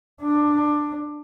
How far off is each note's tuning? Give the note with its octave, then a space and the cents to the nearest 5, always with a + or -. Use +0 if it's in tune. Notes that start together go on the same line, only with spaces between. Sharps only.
D4 +10